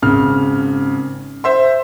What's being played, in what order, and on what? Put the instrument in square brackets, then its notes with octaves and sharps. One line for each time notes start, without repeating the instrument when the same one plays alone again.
[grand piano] G#1 C#3 F6
C5 E5 C6